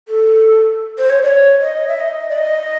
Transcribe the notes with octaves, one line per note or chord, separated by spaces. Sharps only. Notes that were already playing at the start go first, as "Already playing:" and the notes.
A4
C5
C#5
D5
C#5
D#5
E5
D#5
D5
D#5